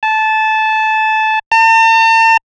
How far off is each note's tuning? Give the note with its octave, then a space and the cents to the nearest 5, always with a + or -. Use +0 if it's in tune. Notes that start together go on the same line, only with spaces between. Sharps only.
A5 -15
A5 +45